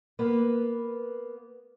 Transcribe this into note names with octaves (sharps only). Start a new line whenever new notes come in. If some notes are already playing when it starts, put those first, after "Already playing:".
A#3 B3 B4